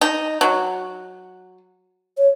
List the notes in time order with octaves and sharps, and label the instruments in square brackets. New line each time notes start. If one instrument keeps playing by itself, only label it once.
[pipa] D#4
F#3
[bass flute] C#5